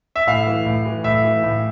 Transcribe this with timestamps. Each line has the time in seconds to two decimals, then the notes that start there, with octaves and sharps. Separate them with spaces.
0.16 E5
0.27 A2 F5
0.47 E3
0.66 A2
0.85 E3
1.04 A2 E5
1.24 E3
1.43 A2